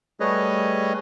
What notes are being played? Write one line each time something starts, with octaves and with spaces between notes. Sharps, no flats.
G3 A3 G#4 B4 C#5 D#5